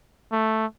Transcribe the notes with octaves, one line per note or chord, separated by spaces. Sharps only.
A3